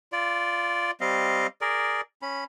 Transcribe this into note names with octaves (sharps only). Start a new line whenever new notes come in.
F4 D5
G3 C4 D#5 F5
G#4 A#4 D5
C#4 B5